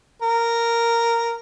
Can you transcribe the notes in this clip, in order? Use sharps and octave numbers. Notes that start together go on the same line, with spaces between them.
A#4